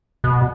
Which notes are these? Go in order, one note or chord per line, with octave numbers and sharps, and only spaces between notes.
B2